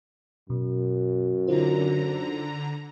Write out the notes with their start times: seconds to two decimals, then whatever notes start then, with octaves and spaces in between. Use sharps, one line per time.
0.50 F#2 B2
1.47 D3 D#4 F4 C5 A#5